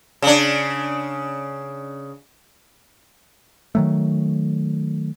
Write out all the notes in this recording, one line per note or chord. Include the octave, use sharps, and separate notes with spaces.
C#3 D4
D#3 F#3 A3